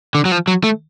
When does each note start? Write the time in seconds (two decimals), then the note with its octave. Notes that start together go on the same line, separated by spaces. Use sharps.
0.15 D3
0.25 F#3
0.32 F3
0.48 F#3
0.64 A3